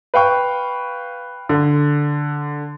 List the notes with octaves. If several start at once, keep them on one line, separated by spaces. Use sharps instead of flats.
B4 F5 G5 C#6
D3